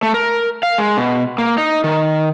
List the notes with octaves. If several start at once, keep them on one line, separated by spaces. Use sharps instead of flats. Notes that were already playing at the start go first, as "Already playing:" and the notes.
A3
A#4
F5
G#3
B2
A#3
D#4
D#3